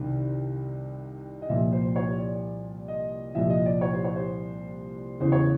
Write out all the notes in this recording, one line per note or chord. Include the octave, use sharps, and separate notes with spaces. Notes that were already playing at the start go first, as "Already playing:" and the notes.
Already playing: C2 C3 D#3
D#5
C2 A#2 F3 E5
C5
C#5
D5
D#5
C2 A#2 F3 E5
D#5
D5
C#5
C5
C#5
C5
E2 C#3 E3 C5
C#5